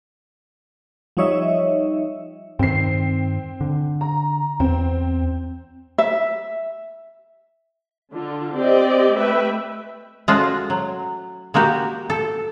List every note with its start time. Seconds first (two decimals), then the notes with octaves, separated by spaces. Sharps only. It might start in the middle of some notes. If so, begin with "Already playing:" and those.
1.17 F3 G3 D#4 C#5 D#5 E5
2.59 G2 D#3 C4 C7
3.61 D3
4.01 A#5
4.60 E2 C4
5.98 E5
8.11 D3 F4
8.54 C4 G4 D5 D#5
9.16 A3 B4 E5 G5
10.28 G#3 A3 C#4 F4 F#4
10.70 F#3
11.54 G#3 A#3 F#4 G4
12.10 A4